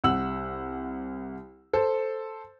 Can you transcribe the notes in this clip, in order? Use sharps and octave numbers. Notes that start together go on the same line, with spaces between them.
C2 F#5 E6 F#7
A4 C5